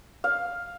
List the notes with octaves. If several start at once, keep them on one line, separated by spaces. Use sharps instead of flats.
F5